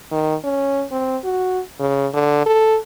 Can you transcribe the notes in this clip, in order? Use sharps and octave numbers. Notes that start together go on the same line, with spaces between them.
D#3
C#4
C4
F#4
C#3
D3
A4